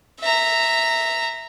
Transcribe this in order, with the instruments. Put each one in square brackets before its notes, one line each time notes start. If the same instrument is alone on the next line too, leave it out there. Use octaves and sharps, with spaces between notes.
[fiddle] E5 A#5